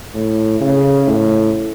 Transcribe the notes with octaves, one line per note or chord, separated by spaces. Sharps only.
A2
C#3
A2